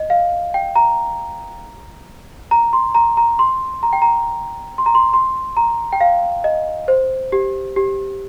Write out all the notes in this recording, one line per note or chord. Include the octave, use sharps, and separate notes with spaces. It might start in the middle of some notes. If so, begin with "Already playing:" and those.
Already playing: D#5
F5
G5
A#5
A#5
C6
A#5
A#5
C6
A#5
G5
A#5
C6
A#5
C6
C6
A#5
G5
F5
D#5
C5
G4
G4